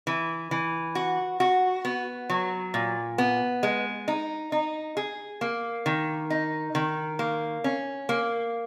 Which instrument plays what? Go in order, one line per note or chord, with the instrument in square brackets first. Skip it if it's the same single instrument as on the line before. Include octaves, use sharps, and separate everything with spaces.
[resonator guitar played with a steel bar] E3
E3
F#4
F#4
B3
F#3
A#2
B3
G#3
D#4
D#4
G#4
A#3
D#3
D#4
D#3
A#3
C#4
A#3